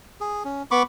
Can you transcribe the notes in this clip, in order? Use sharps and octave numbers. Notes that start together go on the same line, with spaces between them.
G#4
C#4
B3 B5 C#6 D6